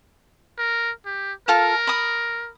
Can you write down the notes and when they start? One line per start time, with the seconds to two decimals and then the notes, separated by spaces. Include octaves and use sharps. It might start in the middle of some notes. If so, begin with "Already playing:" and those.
0.58 A#4
1.06 G4
1.48 F4 A4 A#4 F5
1.87 B5 D#6